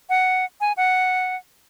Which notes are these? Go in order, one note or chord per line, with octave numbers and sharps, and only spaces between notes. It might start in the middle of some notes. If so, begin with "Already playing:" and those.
F#5
G#5
F#5